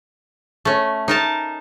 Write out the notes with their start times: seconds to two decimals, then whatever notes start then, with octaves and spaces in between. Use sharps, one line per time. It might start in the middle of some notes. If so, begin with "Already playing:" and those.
0.65 A3 C#4
1.08 D#4 A#4 A5